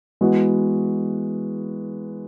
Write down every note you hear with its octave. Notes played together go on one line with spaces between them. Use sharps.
E3 G#3 B3 F#4